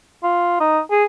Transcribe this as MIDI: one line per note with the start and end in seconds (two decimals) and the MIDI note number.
0.23 0.56 65
0.60 0.80 63
0.90 1.05 68